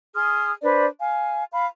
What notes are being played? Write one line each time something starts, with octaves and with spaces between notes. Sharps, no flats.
G#4 C6 D#6 F6
D4 B4 C5 D5
F5 G#5
F5 B5